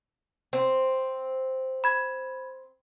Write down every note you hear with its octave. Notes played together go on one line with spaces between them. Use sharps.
C4
B5 G#6